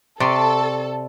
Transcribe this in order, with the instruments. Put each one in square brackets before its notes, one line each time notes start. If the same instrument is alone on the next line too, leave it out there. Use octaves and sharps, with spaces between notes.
[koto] C3 [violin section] A4 [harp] D5 C6 C#6